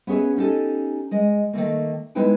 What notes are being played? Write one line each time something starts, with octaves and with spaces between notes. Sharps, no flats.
B3 C#4 G#4 C#5 E5
C#4 D#4 G4 A4
G#3 D#5
D#3 E3 A3 A#3
G#3 B3 D#4 E4 B4 G5